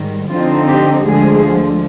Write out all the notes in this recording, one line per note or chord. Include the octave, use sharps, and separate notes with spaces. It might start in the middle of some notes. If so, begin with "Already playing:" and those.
Already playing: G#2 D#3 G3
D3 F3 C4 D#4 F4
G4
D2 D3 F3 G#3 G#4